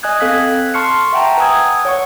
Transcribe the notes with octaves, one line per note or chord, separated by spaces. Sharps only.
D#5 G#5 D#6 F#6 G#6
C4 A4 F5 F#6 G#6 B6
A5 C6 C#6 F6 C7 C#7
E5 F#5 G5 A5 A#5
B4 F#5 G#5 D#6 E6 G#6
C#5 F#5 C#6